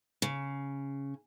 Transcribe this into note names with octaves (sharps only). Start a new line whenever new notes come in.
C#3